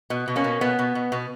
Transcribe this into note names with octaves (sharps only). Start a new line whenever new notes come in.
B2
B2
A#3 C#4
B2
B2 B3
B2
B2
B2